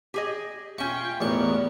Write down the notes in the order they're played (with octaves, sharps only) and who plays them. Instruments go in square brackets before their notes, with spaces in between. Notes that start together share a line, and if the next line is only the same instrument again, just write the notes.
[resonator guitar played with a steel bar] G4 G#4 D#5
[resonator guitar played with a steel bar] C#4 E5 [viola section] F4 G5 [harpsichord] C#6
[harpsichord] A1 E2 C#6 [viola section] B3 A#4